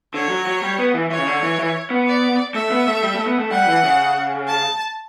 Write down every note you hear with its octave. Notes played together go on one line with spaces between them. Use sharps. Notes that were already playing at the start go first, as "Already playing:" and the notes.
D3 C#5
F#3
F#3
G3
B3
E3
E3 C#5
C#3
D3
E3
E3
B3
D5
A3 E5
B3
A3
G3
A3
B3
A3
G3 F#5
E3
C#3
A5